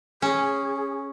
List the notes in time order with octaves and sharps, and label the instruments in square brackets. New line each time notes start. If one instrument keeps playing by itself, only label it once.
[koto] C#4 [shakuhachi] G#4